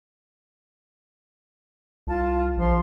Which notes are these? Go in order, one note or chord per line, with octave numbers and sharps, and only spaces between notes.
C2 F4 A5
A#1 F3 C6